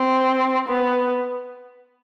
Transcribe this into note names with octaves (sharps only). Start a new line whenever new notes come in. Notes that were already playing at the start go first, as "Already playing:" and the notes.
Already playing: C4
B3